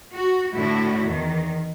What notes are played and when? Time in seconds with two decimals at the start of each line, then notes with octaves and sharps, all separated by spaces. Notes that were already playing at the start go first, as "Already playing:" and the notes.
0.15 F#4
0.55 A2 D3 D4 E4 F#4
1.04 E2 D#3